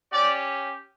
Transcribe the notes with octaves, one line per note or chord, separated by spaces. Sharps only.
C#4 G4 D5